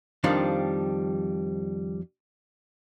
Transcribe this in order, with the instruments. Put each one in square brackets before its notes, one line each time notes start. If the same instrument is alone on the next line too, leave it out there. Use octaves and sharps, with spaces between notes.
[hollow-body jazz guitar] F2 D#3 F3 G3 D4